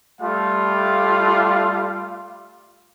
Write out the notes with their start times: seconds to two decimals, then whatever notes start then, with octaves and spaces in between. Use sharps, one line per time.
0.21 G3 A3 F4 F5